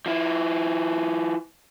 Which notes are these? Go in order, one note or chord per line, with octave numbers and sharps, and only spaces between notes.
F3 E4